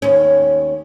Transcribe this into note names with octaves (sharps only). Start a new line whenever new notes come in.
D#2 C#4